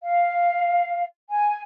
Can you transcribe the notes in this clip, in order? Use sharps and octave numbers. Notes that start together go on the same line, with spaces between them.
F5
G#5